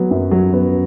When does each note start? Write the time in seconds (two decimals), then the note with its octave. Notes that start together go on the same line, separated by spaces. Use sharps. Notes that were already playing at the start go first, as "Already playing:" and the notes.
Already playing: F#3 B3
0.11 F#2
0.31 F#3
0.53 B3